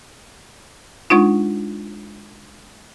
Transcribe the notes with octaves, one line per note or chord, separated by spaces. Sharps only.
G#3 D4 D#4 F4